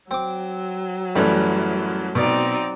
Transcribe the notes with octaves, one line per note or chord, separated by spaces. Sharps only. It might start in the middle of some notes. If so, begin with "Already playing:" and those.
F#3 C4 D6
F#2 A2 E3 G3
B2 C4 D#4 D5